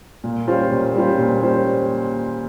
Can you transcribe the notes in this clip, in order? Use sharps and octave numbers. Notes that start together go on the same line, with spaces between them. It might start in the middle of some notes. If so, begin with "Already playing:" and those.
A#2
G3 C#4 F4 C5
A#2
G3 C#4 F4 C5
A#2
G3 C#4 F4 C5